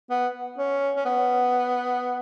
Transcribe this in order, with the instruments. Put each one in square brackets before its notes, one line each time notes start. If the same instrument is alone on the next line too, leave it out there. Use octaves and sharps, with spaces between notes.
[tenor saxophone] B3
C#4
C#4
B3